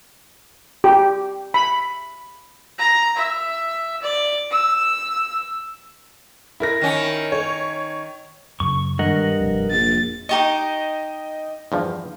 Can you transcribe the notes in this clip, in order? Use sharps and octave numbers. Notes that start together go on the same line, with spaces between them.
G4
B5
A#5
E5
D5
E6
E4 A#4 A#6
D#3 C#4
C#5
F#2 C#3 C#6
G2 D#3 G#3 A#4 D#5 F#5
F1 F2
A#1 A6
D#4 G4 D#5 C#6
E2 G2 F3